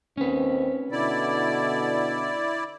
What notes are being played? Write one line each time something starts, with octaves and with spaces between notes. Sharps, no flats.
D#2 C4 C#4 B4
B2 D3 E4 D5